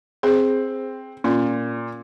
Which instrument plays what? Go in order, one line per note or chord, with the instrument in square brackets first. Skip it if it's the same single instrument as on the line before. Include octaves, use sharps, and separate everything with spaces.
[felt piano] C4 [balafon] G#4 C5
[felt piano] A#2 [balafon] C#4